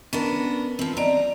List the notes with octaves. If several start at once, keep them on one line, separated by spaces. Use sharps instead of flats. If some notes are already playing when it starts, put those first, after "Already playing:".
B3 C#4 D4 A#4
F3 C4
D5 D#5 A#5